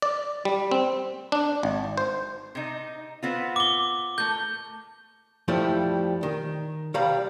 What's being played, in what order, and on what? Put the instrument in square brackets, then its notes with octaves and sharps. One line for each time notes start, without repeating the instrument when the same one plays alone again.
[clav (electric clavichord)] D5
G3
C4
D4
G#1
C5
[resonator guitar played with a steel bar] C3 D#4
B3 C4 F4
[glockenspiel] D6 G7
[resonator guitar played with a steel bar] A3 A#4 [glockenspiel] G6
[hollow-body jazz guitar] F2 F3 G3 A3 E4
D#3
C2 G3 F5 A#5 B5